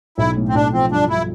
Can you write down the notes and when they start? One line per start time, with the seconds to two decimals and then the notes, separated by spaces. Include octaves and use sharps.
0.18 B1 E4
0.36 A2
0.49 C4
0.54 B1 D4
0.73 F3 C4
0.91 G2 D4
1.09 G2 E4